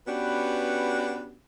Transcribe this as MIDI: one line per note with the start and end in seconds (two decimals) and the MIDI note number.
0.06 1.35 59
0.06 1.35 61
0.06 1.35 62
0.06 1.35 66
0.06 1.35 67
0.06 1.35 71